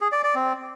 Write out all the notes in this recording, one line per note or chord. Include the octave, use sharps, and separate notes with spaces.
G#4
D5
D5
C4